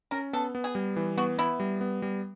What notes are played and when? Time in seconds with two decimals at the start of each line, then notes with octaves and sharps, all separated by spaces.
0.11 C#4 A#4
0.33 B3 A4
0.55 B3
0.64 G#4
0.75 G3
0.96 E3
1.17 B3 F#4
1.38 B3 E4
1.60 G3
1.81 B3
2.02 G3